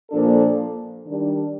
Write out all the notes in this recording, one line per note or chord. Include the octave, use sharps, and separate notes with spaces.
A#2 F3 A#3 D4 A4
D#3 G3 D4